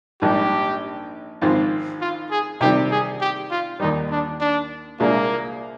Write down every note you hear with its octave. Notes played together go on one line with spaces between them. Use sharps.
A#1 G#2 G3 G4
G#1 G#2 F3 C4 F4
F4
G#4
C3 D#3 G3 C4 G4
G#4
G4
F4
D#2 D#3 G3 D#4
D4
D4
C2 A#2 G#3 A#3 D4